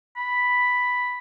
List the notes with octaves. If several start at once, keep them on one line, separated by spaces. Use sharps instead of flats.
B5